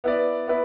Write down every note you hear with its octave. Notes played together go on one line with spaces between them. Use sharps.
B3 E4 B4 D5
B3 E4 B4